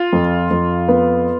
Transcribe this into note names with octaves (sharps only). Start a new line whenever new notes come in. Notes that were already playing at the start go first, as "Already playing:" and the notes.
Already playing: F4
F2
F2
B3